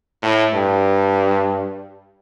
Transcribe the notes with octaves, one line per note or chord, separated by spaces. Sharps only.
A2
G2